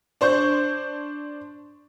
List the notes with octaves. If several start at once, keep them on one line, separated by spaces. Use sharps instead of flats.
D4 C5 C#6 G6